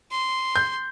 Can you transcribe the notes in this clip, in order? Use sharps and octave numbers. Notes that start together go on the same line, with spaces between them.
C6
G6